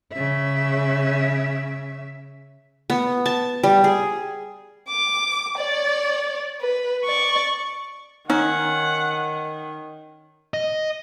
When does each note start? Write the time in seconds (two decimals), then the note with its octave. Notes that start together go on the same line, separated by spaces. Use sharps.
0.12 C#3 E5
2.90 B3
3.26 A5
3.63 G3
3.84 G#4
4.90 D6
5.58 C#5 D5
6.61 B4
7.05 D5 C#6
8.30 D#3 C#4 D#4 F#5
10.54 D#5